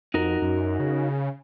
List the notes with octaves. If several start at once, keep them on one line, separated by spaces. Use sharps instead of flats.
F2 D#4 F#4 A#4
F#2
C#3